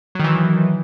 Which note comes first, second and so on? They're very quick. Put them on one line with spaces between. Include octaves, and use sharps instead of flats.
F#3 D#3 E3